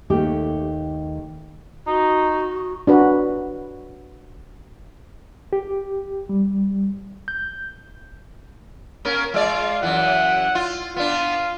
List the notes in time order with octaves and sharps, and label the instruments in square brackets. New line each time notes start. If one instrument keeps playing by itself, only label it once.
[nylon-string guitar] D#2 A3 G4
[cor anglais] D#4 [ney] F#4
[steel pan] D4 F#4 B4
[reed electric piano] G4
G3
G6
[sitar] A#3 C#4 A#4
[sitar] G#3 D5 [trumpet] F4
[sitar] F#2 E3 [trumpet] F#5
[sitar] F4
[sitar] B3 D4 [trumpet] F4